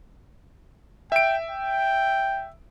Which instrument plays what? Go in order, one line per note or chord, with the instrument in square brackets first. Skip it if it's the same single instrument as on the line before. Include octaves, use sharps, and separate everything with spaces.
[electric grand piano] E5 D7 [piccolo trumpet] G5
[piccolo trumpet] G5